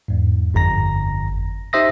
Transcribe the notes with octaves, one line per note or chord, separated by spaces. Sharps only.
E2 G#2
G1 F2 A#5 A#6
D#4 G4 C5 E5 D#6 A#6